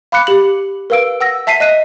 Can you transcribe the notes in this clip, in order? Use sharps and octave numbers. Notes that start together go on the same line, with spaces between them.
F5 B5 D6 F#6 C#7
G4 F#7
A#4 B4 F5 E6 D7
F#5 E6 A#6
E5 A5 B6 C7 D#7
D#5 F#6 D#7